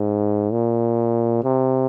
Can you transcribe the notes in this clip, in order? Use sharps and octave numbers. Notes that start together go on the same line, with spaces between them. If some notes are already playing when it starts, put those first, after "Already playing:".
Already playing: G#2
A#2
C3